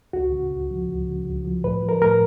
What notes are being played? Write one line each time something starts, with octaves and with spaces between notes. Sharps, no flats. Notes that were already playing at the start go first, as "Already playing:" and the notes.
C#2 F#4
C#3
C#2
F3
C#2
C#3
C#2
F3
A2 B4
F3
A#4
A2 A#4